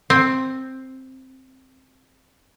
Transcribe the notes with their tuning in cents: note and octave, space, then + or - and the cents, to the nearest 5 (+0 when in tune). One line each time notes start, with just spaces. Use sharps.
C4 +5